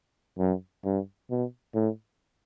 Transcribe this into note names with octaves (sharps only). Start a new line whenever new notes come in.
F#2
G2
B2
A2